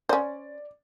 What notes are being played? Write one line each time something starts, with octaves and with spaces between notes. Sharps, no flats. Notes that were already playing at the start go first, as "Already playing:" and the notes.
C#4 C5 D5